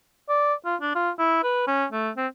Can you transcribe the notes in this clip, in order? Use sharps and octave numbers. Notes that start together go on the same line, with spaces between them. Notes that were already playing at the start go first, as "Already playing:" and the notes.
D5
F4
D4
F4
E4
B4
C#4
A3
C4